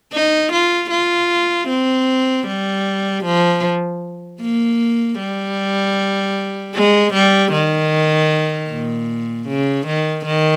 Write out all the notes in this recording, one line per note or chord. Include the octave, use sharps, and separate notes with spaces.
D#4
F4
F4
C4
G3
F3
A#3
G3
G#3
G3
D#3
A#2
C#3
D#3
D#3